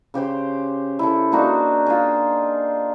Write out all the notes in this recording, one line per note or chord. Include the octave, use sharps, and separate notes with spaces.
C#3 G4 C5 C6
E4 A4
A#3 D4 D#4 F#4
F4 G#4